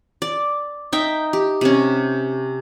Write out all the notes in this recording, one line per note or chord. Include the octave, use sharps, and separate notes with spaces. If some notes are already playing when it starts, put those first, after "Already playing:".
D5
D#4 E5 G5
G4
C3 C#4